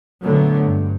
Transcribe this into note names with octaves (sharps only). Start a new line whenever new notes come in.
A#2 D3 F#3 A3 B3
G2